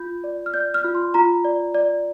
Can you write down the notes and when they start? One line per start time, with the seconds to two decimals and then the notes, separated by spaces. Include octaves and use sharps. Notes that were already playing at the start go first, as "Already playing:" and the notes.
Already playing: F4 G6
0.24 D5
0.46 F6
0.54 D5 G6
0.74 F6
0.84 F4
0.95 C6
1.14 F4 A#5
1.44 D5
1.74 D5